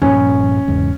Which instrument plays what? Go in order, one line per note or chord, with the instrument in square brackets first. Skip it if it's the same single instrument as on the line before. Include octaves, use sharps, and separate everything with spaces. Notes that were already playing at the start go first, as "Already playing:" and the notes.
[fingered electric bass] G2 A#2 F3 [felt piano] C#4
[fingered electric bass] E2 G#2 C#3